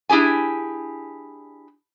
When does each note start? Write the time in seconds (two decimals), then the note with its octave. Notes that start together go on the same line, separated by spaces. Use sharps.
0.09 D4 E4 G4 G#4 G#5